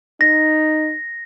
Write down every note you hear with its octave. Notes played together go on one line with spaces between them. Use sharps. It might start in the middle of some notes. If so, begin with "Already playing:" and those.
D#4 A#6